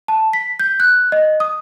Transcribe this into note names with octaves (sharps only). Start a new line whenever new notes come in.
A5
B6
G6
F#6
D#5
D#6